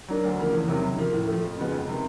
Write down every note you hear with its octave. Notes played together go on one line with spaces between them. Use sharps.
F#3 A#3 D4
D2
C#3 F3 A#3
E2
C3 D#3 F#3
C#3
F3 A#3
A2
A3
F3
F2
C#3 F3 G#3 B3
F2
C3 D#3